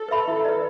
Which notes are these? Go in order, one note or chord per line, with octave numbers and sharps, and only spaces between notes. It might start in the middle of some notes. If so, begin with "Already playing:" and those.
Already playing: A4
B4 E5 B5
E4
B4 D5